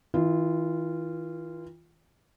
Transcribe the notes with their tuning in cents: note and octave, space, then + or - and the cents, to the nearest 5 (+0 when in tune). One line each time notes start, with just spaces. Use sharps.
E3 -45 F4 -15